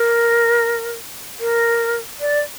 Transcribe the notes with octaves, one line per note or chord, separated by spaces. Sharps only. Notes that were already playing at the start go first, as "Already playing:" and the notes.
Already playing: A#4
A#4
D5